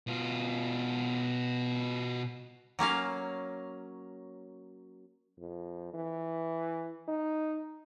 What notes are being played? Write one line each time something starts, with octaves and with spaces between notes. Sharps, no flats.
B2 F4
F#3 A#3 C#4 F5
F2
E3
D#4